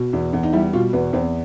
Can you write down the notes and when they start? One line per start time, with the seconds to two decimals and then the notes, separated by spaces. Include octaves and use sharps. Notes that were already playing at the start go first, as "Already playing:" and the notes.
Already playing: B2
0.13 E2
0.33 E2
0.43 D#4
0.53 G3 E4
0.73 B2 F4
0.93 E2 B3
1.13 E2 C4